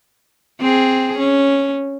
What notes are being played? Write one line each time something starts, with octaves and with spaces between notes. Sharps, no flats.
C4 G#4
C#4